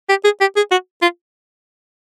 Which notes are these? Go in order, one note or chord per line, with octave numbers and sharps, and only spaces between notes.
G4
G#4
G4
G#4
F#4
F4